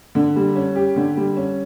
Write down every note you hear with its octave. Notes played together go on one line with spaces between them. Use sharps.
D3
G3
C#4
G4
D3
G3
C#4